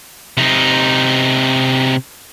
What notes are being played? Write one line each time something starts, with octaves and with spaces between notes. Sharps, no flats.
C3 D#4